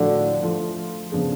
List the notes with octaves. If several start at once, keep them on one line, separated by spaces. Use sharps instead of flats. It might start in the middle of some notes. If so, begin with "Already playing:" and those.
Already playing: A2 D3 F3 A3 D4 F#4
F3 A3 F4
C#3 F3 B3 D4 G#4